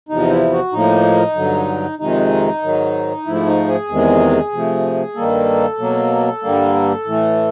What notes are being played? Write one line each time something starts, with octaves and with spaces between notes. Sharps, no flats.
E2 C3 F3 D#4
E4
F#4
A2 F3 A#3 D#4
G2 D3 F#3
F2 C3 D#3 G#3 D#4
G#2 D#3 F#3
G#2 F3 A3 E4
D#4
G#4
E2 C3 D#3 G#3
C3 F3 A3
G2 D#3 G3 A#3 A4
B2 F#3 A#3
G2 D3 G3 A#3
A2 E3 A3